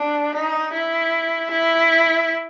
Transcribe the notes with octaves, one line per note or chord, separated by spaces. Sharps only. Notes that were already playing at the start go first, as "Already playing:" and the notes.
Already playing: D4
D#4
E4
E4